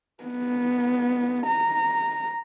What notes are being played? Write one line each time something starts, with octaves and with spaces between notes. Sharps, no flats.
B3
A#5